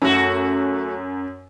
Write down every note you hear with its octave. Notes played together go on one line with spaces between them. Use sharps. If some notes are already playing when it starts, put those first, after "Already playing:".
F#2 A3 F#4